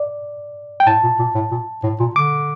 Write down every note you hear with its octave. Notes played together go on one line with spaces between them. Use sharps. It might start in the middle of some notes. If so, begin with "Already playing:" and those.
Already playing: D5
G5
A2 A5
A#2
A#2
A2
A#2
A2
A#2
D3 D6